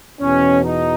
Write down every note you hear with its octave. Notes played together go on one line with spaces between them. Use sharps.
E2 B2 C#4
D#4